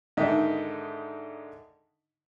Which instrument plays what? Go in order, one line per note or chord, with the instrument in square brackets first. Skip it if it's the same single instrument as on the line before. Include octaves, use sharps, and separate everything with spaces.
[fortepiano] G#2 D3 D#3 D#4 E5